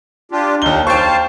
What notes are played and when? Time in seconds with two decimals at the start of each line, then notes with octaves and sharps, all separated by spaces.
0.32 D4 F4 G4
0.62 D#2 D#4 G7
0.87 C5 F5 G5 A5 C#6